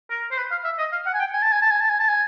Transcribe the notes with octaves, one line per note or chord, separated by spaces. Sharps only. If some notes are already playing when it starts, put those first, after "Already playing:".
A#4
C5
B4
F5
E5
D#5
F5
F#5
G#5
G5
G#5
A5
G#5
A5
G#5
A5
G#5
A5
G#5